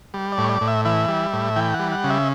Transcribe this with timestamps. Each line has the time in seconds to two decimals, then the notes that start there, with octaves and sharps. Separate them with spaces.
0.14 G3
0.32 D5
0.38 A2
0.44 C#5
0.49 D5
0.61 A2
0.68 E5
0.85 E3 E5
1.08 G3
1.33 A2
1.56 E3 G5
1.74 F#5
1.79 G3
1.92 F#5
2.04 C#3
2.10 E5